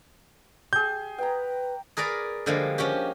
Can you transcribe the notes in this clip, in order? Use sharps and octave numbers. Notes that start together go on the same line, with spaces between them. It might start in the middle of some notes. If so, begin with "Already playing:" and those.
G4 G#4 G6
B4 G5 A#5
G#4 A#4 B4 D5 A#5
D3 F3 G3 G#3 A#3
F3 C#4 F#4 G4